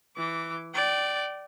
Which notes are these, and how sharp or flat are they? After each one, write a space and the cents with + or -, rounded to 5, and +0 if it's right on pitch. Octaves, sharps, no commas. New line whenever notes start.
E3 +0 D6 -20
D5 +0 G5 -30